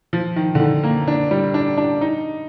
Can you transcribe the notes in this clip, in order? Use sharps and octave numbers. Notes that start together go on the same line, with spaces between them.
F3
D#3
D3
D#3
A#3
D4
G3
D4
D4
D#4